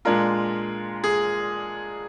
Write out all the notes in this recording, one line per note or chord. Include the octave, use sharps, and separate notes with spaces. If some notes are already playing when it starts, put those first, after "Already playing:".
A#2 G#3 D4 F4 A#4
G#4